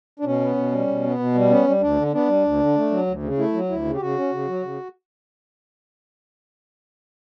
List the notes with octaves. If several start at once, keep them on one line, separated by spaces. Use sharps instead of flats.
D4
B2 C#4
B3
B2
G3
B2
B3
B2
G3
B3 C#4
G3
D2 D4
D3
B3 D4
G3
D2
D3
A3
F#3
D2
C#3
A3 E4
F#3
D2 E4
C#3
G4
C#3 F#4
C#4
C#3
F#3
C#3